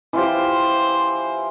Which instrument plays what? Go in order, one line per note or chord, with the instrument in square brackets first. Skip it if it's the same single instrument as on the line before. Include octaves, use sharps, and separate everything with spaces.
[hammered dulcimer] E3 F4 G4 [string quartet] C5